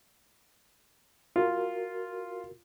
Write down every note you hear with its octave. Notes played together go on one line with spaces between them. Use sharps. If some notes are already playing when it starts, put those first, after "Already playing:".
F4 F#4 A#4